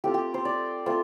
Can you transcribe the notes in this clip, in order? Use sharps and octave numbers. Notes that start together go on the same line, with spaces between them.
A3 C4 F4 G4
G4
C5
D5
A3 C4 F4 C5